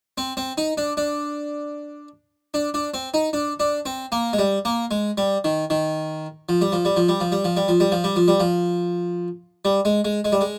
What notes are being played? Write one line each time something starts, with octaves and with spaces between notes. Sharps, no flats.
C4
C4
D#4
D4
D4
D4
D4
C4
D#4
D4
D4
C4
A#3
G#3
G3
A#3
G#3
G3
D#3
D#3
F3
G3
F3
G3
F3
G3
F3
G3
F3
G3
F3
G3
F3
G3
F3
G3
F3
G3
G#3
G#3
G#3
G3
G#3